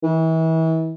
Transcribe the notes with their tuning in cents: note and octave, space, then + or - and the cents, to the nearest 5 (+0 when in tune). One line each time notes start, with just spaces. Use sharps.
E3 -35